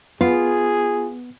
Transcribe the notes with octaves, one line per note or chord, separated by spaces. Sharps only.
B3 F4 G#4